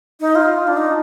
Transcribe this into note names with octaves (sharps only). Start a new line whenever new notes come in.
D#4
F4
D4
D#4